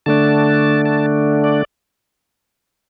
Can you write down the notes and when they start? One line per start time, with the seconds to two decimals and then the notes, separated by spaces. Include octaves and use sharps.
0.06 D3 A3 D4 A5
0.85 A5
1.44 D5